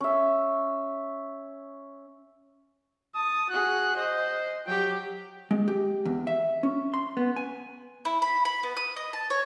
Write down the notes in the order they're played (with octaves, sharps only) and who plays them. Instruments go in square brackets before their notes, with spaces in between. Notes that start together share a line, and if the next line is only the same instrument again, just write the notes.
[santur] C#4 E5
[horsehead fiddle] A5 [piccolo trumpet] D#6
[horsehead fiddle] F#4 G#4 [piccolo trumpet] F#6
[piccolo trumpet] C5 [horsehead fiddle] D#5
[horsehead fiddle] F#3 G4 [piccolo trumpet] G5
[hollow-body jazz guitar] G#3
G4
E2
E5
C#4
C6
B3
G#5
[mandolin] E4
B5
B5
B3
D#6
D#5
A5
C#5